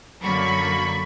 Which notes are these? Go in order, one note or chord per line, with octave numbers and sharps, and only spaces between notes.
F#2 D3 F#3 A#3 B5 C#6